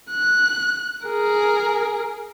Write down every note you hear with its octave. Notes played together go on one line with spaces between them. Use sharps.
F#6
G#4 A#4